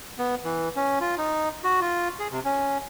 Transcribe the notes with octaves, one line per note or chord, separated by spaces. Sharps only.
B3
E3
C#4
F4
D#4
F#4
F4
G#4
C3
C#4